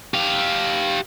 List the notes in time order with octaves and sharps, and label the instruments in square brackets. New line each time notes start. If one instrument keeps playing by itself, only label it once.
[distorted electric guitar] G4 F5